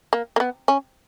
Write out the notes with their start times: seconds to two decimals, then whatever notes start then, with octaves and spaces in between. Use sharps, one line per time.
0.13 A#3
0.36 A#3
0.40 B3
0.68 C#4